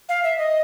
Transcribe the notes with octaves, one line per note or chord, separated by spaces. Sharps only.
F5
E5
D#5